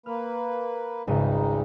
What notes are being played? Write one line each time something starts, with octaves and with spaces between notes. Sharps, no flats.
A#3 B4 F6
G#1 C#2 G3 G#3 D#4 D#7